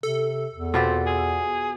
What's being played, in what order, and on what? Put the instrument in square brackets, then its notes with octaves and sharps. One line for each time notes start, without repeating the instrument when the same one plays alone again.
[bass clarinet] C3 [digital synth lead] A4
[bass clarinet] E2
[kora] B2 F4 G4 [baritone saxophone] C4
[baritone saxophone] G#4